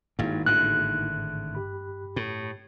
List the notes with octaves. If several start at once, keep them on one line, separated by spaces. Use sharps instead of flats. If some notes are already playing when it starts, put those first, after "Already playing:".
G#1 G2 A#3 D#4 E4
G#1 A2 D3 F#6
G2 G4 B5
A2